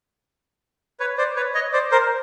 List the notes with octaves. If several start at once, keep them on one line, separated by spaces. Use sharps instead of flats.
B4 C#5
C5 D5
B4 C#5
C#5 D#5
C5 D5
A#4 C5